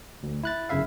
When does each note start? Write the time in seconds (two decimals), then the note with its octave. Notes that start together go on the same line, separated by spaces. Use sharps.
0.23 D2
0.43 E4 F#6 A6
0.69 G1 F#2 C#3 E4 E5 F5